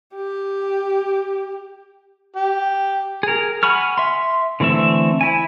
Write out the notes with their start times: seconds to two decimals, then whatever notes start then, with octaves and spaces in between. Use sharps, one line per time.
0.15 G4
2.36 G4
3.23 G#4 A#4
3.63 F#5 G#5 B5 C#6 F6
3.98 E5 C6
4.60 D3 E3 A3 C4 E5
5.21 E4 G#5